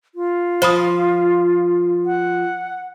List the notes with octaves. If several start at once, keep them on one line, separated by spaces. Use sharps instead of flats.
F4
F3 C5 B5 D#6
F#5